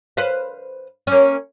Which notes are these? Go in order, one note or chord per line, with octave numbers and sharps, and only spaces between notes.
B4 C5 F5
A#3 C#4